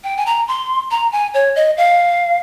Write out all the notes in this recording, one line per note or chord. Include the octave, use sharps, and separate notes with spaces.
G5
G#5
A#5
C6
A#5
G#5
C#5
D#5
F5